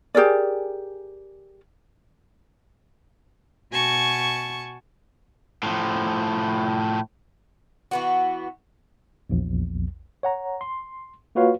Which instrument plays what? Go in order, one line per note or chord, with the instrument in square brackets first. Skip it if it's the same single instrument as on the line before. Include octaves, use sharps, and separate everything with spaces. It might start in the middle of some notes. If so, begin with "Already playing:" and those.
[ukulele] G4 G#4 A#4 D5
[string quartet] B2 F#4 G#5 A5 C#6
[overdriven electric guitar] A2 F3
[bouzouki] E3 B3 F#4
[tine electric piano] A#1 E2
C#5 F#5 A#5
C6
A#3 F4 F#4 B4 C#5 F5